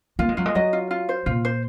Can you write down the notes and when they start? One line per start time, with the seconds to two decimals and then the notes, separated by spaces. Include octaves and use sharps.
0.19 A#3 F4
0.29 G#3
0.37 F#3 F4
0.46 G#3
0.55 F#3 D#5
0.73 F4
0.91 F4
1.09 C5
1.26 A#2 F4
1.45 C5